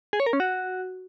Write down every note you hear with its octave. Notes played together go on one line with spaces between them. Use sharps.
G#4
C#5
A#4
C#4
F#4